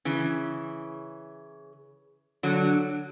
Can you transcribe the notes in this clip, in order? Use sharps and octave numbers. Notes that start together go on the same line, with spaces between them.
C#3 E3
D3 F#3